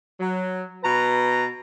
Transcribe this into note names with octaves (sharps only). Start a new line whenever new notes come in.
F#3
B2 B4 A#5